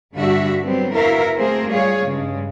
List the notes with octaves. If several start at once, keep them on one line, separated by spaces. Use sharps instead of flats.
G2 D3 G3 F#4 E5
F#3 G3 B3 C4
B3 E4 F#4 A#4 E5 F5
A3 A#3 C4 G#4 A#4 C5
G3 F4 G#4 C#5 F5
G2 C#3 G#3